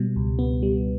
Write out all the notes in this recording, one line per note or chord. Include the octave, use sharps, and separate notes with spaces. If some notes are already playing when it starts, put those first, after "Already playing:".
Already playing: B2 G3
C#2
B3
G3